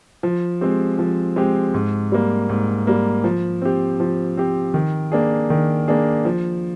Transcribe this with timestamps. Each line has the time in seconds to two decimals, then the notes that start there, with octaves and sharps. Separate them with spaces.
0.23 F3
0.61 G#3 C4 G4
0.99 F3
1.36 G#3 C4 G4
1.74 G#2
2.12 G3 A#3
2.49 G#2
2.87 G3 A#3
3.24 F3
3.62 C4 G4
4.00 F3
4.37 C4 G4
4.74 D#3
5.12 A#3 D4 G#4
5.50 D#3
5.88 A#3 D4 G#4
6.25 F3